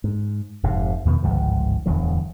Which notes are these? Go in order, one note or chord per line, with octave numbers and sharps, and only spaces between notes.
G#2
F1 G#2 C3
E2 B2 D#3 B3
G1 C#2 G#2 F3
D1 E2 D3 F#3